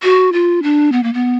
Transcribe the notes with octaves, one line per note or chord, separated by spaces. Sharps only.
F#4
F4
D4
B3
A#3
B3